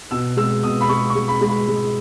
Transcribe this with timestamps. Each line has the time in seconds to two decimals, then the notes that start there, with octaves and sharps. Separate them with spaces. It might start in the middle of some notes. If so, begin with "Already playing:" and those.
0.11 B2 E6
0.37 G#3 E6
0.63 B2 D#6
0.81 B5
0.89 G#3 C#6
1.10 C#6
1.15 G#3
1.28 B5
1.41 G#3
1.48 B5
1.68 G#3